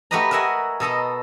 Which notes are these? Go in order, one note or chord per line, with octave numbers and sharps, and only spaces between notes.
A3 F#4 G4 B4 D#5 A#5
A#4 D#5 E5 F#5 G#5
B2 A4 D#5 A#5